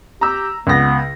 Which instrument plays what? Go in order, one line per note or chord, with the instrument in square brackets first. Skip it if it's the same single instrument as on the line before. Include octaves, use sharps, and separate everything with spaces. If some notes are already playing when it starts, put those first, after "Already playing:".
[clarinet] G4 [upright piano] A#5 E6
[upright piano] C#2 A#6 [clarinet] B3